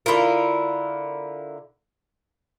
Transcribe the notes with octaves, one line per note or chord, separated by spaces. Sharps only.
D3 E4 F4 A#4